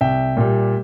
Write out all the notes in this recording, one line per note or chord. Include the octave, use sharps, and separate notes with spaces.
C2 E5 G5
A#2 G3